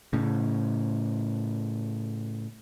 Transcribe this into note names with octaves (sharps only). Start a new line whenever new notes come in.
A2 C#3